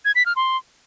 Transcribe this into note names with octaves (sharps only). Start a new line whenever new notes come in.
G#6
B6
F6
C6